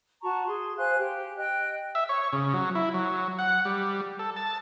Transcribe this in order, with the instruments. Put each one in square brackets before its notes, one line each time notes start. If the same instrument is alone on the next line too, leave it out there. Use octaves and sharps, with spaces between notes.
[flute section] F#4 A5 A#5 C#6
G#4 C6
C5 F5 G#5 F#6
G4
D#5 G5 F#6
[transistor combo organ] E5
C#5
C#3
F#3
E4
F#3
F#5
G3
A4
A5